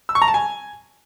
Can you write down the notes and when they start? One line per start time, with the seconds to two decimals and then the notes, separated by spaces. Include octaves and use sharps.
0.09 E6
0.15 C#6
0.22 A#5
0.28 A5
0.34 G#5